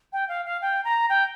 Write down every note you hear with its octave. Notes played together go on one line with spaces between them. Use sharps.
G5
F5
F5
G5
A#5
G5